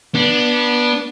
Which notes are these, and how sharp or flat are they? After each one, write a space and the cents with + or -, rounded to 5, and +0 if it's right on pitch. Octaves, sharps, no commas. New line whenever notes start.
B3 -25 D4 +0